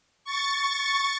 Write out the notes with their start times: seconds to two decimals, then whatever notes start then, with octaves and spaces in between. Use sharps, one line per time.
0.24 C#6 A6